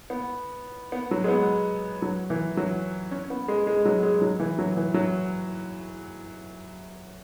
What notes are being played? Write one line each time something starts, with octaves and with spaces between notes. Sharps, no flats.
B3
B3
F#3
G#3
B3
F#3
E3
F#3
C#4
B3
G#3
G#3
F#3
G#3
F#3
E3
F#3
E3
F#3